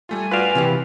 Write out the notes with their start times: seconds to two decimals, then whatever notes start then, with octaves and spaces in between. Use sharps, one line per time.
0.09 G3 A3 F4 G#5
0.31 F4 F#4 B4 D5 F5
0.55 C3 E3 G4